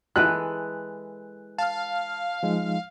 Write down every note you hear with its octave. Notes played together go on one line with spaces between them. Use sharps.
E3 G#3 A4 F#6
F5 A5 F6
F3 G#3 D#4